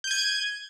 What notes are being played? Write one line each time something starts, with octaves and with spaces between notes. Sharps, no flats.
G6 G#6 D#7